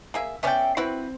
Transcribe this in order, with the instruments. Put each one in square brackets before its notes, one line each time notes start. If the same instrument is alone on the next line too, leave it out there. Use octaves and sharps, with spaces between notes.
[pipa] A#3 G#4 E5
[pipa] B3 C#4 D5 [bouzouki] E5 F5 G5
[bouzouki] C4 [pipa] E4 F#4 B4